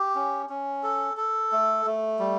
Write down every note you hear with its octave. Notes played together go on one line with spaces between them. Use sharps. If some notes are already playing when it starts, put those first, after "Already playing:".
Already playing: G4
C#4
C#4
A4
A4
A3
A3
G3